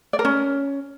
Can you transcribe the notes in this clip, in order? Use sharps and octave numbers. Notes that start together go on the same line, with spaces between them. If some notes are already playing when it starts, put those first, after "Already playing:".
D5
A#4
C#4